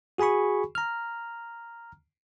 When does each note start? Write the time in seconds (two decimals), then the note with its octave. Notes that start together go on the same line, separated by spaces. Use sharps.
0.18 F#4 G#4 G#5 B5 C#6
0.75 A#5 F6